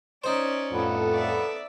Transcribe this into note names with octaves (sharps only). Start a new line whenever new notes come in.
C#4 D#4 C5 D5
F2 A2 B3 F4 A4
D5 E5